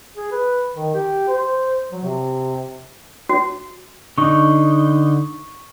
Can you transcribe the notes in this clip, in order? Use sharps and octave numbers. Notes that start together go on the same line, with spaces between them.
G#4
B4
D#3
G4
C5
F#3
C3
F#4
D3 D#4 C#6